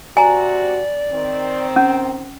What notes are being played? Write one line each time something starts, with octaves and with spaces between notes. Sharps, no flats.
C3 F#4 D5 G#5 A#5
D#3 C4
C#4